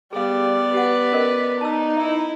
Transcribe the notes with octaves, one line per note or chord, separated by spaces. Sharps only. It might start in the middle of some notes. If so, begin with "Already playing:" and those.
G3 B3 G#4 D5 F5
G4 B4 F#5
C#4 A#4 D#5
D#4 A5 E6
E4 D#5 E5